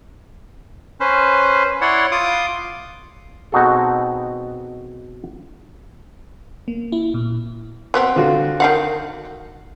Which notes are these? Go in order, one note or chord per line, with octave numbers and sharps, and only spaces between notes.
C#4 B4 C5
E4 C#5 D5 F#5 C6
F4 C6 D6 D#6
B2 C4 D#4 F#4 G#4 A4
A#3
E4
A#2
F#3 B3 C4
D3 F4 F#4
D#3 F5 F#5